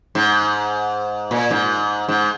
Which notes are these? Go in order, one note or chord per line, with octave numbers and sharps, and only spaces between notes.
G#2
A#2
G#2
G#2